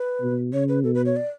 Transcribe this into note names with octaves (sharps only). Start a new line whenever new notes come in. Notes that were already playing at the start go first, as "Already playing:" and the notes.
Already playing: B4
B2
C#3 C#5
B4
B2 A4
B4
C#5
D5